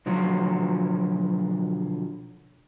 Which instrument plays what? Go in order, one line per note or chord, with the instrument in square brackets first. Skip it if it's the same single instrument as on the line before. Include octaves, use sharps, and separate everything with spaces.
[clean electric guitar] B1 D3 F3 F#3 C#5